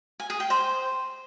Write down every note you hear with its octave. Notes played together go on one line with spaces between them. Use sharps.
G#5
G#4
G5
C5